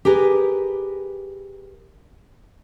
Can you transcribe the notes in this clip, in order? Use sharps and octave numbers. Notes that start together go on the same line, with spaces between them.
G4 G#4 A#4 B4